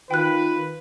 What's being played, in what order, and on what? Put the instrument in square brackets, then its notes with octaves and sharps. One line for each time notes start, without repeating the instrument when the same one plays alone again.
[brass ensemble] D#3 F4 [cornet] B4 [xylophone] G5 F#6